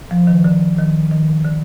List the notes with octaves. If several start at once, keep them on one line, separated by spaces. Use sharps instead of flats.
F3
D#3
D3
D#3
D#3
D3